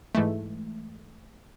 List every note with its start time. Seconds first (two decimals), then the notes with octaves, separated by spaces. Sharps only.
0.15 G#2 E3 G#3 A3